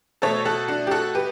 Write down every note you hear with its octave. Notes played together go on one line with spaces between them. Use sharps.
B2 A3 A4 C#5
F#4 A4
D4 F#4
G4
F#4 A4
G4 B4